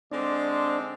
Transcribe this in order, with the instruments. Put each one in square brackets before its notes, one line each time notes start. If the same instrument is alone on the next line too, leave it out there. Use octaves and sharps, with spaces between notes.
[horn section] D3 G#3 C4 [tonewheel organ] D4